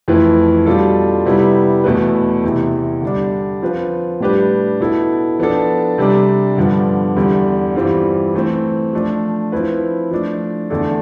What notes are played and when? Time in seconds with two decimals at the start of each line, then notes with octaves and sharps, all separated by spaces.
0.08 F2 E3 A3 E4 B4
0.66 B2 G3 D4 F4 A4
1.25 C3 G3 B3 E4
1.84 E2 B2 A3 E4 B4
2.44 E2 C3 E3
3.02 D3 G3 D4
3.62 F3 C4 F4 B4
4.20 A2 G3 D4 G4 B4
4.80 B2 B3 E4 A4
5.39 F3 B3 D4 A4
5.98 C3 G3 D4
6.57 G2 D3 F3 B3
7.16 E2 D3 G3
7.75 G2 E3 G3 C4 F4
8.35 E3 A3 C4
8.93 F3 A3 D4
9.52 F3 C4 E4 B4
10.11 F3 A3 D4
10.70 E2 D3 A3 D4 A4